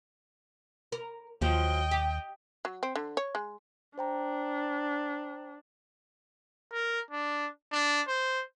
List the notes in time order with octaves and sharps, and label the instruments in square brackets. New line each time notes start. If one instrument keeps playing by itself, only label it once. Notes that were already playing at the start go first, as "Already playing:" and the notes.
[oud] A#4
[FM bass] D#2 [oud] F3 F#3 [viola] D#5 G5
[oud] G4
[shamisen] F#3
C4
D3
C#5
G#3
[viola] D4 [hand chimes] C5 G5 A#5
[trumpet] A#4
D4
D4
C5